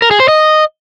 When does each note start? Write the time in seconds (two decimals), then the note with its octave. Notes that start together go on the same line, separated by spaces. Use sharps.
0.02 A#4
0.11 G#4
0.20 C5
0.28 D#5